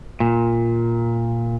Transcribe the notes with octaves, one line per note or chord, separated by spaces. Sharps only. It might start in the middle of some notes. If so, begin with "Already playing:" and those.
A#2